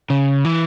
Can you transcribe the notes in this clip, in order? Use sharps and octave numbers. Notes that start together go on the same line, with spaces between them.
C#3
E3